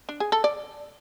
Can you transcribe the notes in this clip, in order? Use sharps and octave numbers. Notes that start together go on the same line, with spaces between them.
D4
G#4
A4
D5